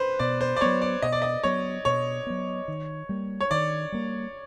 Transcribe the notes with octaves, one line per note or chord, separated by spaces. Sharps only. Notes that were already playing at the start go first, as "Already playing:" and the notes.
Already playing: B4 C5
B2 D5
C5
D5
F#3 B3 C#5
D5
B2 D#5
D5
D#5
F#3 B3 C#5
B2 C#5
F#3 B3
D#3
G3 A#3
C#5
D#3 D5
G3 A#3